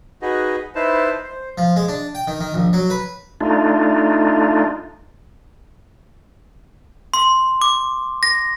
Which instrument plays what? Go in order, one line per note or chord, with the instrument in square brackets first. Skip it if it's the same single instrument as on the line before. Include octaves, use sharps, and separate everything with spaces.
[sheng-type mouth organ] D#4 F#4 G#4 B4 D#5
D#4 E4 B4 C5 A5
C5
[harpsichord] F3
G#3
D4
G5
D#3
D#3
A#1
F#3
B4
[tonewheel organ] A3 D4 D#4 F4
[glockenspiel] C6
D6
A#6